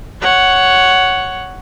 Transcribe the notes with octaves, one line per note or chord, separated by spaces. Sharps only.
C#5 F#5